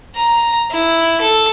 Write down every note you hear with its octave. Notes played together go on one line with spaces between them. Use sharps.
A#5
E4
A4